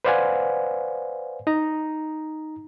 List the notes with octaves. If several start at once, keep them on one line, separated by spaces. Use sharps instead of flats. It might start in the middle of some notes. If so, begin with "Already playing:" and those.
B4 C5 D5 F5 F#5 G#5
D#4 A#5